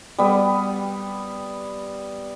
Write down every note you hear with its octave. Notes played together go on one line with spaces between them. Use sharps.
G3 B3